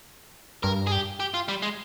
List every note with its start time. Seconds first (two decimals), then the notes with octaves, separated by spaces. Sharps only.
0.63 G2 A#4
0.87 G#4
0.92 G4
1.20 G4
1.34 F4
1.48 G3
1.62 G#3